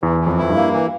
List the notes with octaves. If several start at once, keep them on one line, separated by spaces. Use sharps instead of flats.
E2 E3
E3
F2
F2 E4
G2
A#3
E3